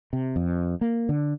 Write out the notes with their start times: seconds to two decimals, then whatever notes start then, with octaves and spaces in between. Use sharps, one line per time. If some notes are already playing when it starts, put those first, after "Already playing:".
0.13 C3
0.36 F2
0.81 A#3
1.09 D3